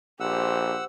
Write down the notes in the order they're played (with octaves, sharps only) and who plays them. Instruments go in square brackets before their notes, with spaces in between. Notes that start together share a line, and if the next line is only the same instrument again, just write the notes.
[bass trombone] A#1 [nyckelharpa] G4 C5 [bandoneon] F#5 E6